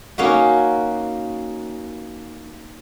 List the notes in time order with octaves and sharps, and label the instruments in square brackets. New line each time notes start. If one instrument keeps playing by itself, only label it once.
[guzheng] A#3 C#4 D#4 F#4